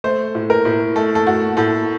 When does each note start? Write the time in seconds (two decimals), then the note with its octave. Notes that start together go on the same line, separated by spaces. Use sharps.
0.04 A3 C5
0.35 A2
0.50 A#4
0.65 A2
0.96 A3 A4
1.15 A4
1.27 A3 F#4
1.57 A2 A4